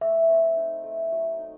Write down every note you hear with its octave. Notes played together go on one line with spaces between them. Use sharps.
A3 E5
C4
D#4
A3
F#3
D#4